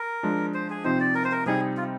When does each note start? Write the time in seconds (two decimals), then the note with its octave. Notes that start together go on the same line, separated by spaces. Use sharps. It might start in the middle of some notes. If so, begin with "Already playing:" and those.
Already playing: A#4
0.23 F3 G#3 D4
0.54 C5
0.70 G#4
0.84 C3 F3 C4 D#4 C5
1.00 D5
1.15 A#4
1.24 C5
1.32 A#4
1.46 C3 G3 C4 D#4 G#4
1.77 F4